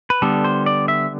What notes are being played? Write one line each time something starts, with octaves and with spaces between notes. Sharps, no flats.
B4
D3 G3 B3 A4
C5
D5
E5